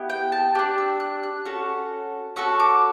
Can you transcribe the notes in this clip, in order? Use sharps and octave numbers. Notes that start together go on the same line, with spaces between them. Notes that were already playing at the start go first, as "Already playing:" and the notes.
Already playing: B3 E4 G4
G5
A5
D4 G4 F#6
E6
F#6
F#6
C#4 F#4 A4
C#4 F#4 A4 E6
D6